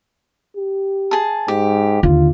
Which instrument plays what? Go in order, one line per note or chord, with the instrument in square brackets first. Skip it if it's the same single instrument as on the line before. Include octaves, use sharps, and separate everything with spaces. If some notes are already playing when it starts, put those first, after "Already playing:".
[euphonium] G4
[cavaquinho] G#4 A5
[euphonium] G#2 [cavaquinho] G4
[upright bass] D#2 D3 [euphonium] F4